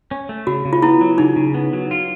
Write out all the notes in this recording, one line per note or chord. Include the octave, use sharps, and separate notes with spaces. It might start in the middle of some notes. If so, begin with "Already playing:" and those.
C#4
A3
C#3 F#4
C#3
F4
B3 E4
F#3
C#3 D#4
C#3
B3
F#3
F4